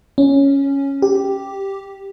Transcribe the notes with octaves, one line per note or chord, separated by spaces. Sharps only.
C#4
G4